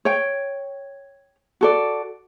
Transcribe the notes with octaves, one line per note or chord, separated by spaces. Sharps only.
C#5 G5
F#4 A4 D5